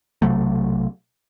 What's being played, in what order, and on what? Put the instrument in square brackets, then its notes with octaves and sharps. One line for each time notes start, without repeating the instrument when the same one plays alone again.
[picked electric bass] B1 C3 F#3 A3